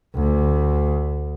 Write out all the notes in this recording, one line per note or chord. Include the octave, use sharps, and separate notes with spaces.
D2